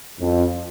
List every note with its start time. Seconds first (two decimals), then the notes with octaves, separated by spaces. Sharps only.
0.19 F2